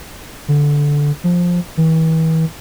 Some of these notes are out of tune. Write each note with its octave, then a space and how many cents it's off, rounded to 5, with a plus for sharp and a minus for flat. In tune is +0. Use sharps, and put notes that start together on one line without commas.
D3 -10
F3 +10
E3 -40